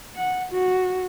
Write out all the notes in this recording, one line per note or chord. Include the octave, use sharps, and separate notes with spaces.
F#5
F#4